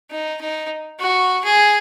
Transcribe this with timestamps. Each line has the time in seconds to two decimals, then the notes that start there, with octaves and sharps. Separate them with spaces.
0.11 D#4
0.41 D#4
0.99 F#4
1.45 G#4